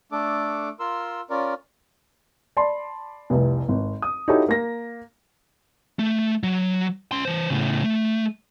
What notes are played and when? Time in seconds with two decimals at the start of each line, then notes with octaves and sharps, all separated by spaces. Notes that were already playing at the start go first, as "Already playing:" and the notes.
0.12 A3 D4 A4 D6
0.80 F4 A#4 C6 E6
1.30 C#4 F4 A#4 D5
2.57 D5 A5 B5 C6
3.30 F1 C2
3.68 G#1
4.02 D#6
4.28 D#4 E4 F#4 G4 A4 C#5
4.49 A#3 A#6
5.99 A3
6.43 F#3
7.12 C#4 C6
7.25 E3 C5
7.50 A2 C#3
7.84 A3